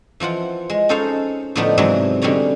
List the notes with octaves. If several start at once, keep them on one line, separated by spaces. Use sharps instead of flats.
E3 F3 F4 F#5
G#3
C#4 D#4 A4 C5 C#5 F5
A2 D3 F3 B3 D4 D#4
G#2 C3 E3 F#3
B2 D3 G3 C#4 C#5 A#5